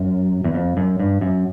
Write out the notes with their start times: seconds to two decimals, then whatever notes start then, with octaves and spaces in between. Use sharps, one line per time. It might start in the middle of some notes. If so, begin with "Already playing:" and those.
Already playing: F#2
0.44 E2
0.54 F2
0.77 F#2
0.99 G2
1.21 F#2